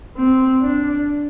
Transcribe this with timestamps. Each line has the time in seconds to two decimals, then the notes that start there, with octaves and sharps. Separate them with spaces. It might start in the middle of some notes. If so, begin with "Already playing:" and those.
0.17 C4
0.61 D4